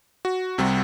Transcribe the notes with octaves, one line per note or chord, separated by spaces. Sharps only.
F#4
C2 C3 G3